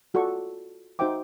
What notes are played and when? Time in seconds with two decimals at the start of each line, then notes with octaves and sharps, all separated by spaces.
0.14 F4 F#4 A4 D5 C#6
0.99 D#4 F#4 C5 E5 G5 D6